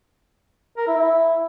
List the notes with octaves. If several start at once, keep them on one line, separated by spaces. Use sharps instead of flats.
A#4
E4
E4